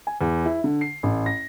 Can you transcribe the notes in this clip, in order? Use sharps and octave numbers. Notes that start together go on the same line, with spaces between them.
G#5
E2
E4
D3
C7
A1
A#6